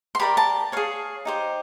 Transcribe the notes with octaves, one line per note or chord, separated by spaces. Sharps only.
C6
G4 A#4 D5 B5
A5
G#4 C#5 F5
D#4 G4 C5